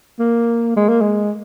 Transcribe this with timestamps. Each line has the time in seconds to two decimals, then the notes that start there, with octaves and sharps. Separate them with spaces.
0.19 A#3
0.76 G#3
0.89 A#3
1.02 G#3